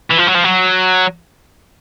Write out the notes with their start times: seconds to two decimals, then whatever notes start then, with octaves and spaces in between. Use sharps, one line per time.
0.11 E3
0.19 F3
0.28 F#3
0.35 F3
0.44 F#3